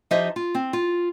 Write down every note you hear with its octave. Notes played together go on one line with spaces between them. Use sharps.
F3 D#4 G4 C5 D#5 E5
F4
C4
F4